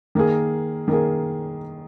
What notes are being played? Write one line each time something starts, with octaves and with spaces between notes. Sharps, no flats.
D#3 A#3 G#4
D#3 A#3 G#4